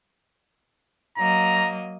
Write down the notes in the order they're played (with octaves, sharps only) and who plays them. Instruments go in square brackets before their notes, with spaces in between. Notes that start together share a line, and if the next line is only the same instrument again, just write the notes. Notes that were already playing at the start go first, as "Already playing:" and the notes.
[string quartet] F#3 A#3 D#5 [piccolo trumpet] A#5